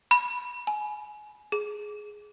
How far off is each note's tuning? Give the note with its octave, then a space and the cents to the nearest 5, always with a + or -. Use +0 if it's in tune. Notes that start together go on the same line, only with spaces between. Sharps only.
B5 -15
G#5 +25
G#4 +10